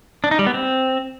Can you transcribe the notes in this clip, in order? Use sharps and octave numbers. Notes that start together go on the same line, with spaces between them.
D4
D#4
G3
B3
C4